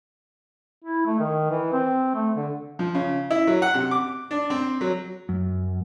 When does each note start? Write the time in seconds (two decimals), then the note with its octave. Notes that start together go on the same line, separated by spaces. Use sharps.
0.84 E4
1.06 A3
1.19 D#3
1.50 E3
1.73 C4
2.15 A3
2.36 D3
2.79 F3
2.95 C#3
3.30 E4
3.47 F#3
3.62 F#5
3.74 C3
3.91 D6
4.31 D4
4.50 C4
4.81 F#3
5.29 F#2